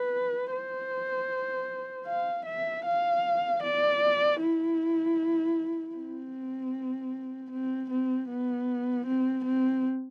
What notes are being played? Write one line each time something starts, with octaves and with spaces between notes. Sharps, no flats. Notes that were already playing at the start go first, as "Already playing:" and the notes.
Already playing: B4
C5
F5
E5
F5
D5
E4
C4
C4
C4
B3
C4
C4